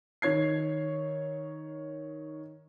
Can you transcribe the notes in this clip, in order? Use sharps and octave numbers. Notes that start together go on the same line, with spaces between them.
D#3 C#5 G#6 C7